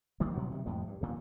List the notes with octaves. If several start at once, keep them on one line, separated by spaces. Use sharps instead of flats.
D#3 G3 A#3
D2 B2 F#3 B3
C3 D#3 G3
F2 A2 C3 G#3
G2
G2 A#2 D#3